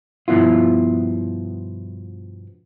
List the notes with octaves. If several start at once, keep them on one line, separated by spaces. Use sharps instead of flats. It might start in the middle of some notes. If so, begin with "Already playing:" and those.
G2 B2 F3 B3 E4 F4